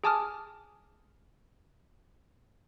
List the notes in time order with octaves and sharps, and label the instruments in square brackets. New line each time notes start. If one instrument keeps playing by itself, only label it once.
[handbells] G#4 G#5 A5 D6 D#6 F6